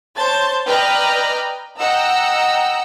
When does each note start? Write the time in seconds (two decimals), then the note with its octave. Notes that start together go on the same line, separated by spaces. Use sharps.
0.18 C5 C#5 A5 G6 A6
0.67 B4 D5 D#5 G5 A#5 F6
1.79 D#5 F#5 G5 A#5 E6